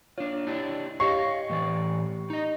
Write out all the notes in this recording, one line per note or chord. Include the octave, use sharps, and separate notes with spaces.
D4 F4 C#5
D4 E4 G4
G4 C#5 D#5 F5 C#6 C7
A2 E3 D5
D#4 D#5